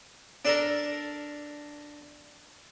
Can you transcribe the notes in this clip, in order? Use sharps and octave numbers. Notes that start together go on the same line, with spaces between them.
D4 A4 A#4